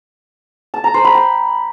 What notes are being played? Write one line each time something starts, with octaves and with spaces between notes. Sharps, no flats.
A5
A#5
C5
B5
G5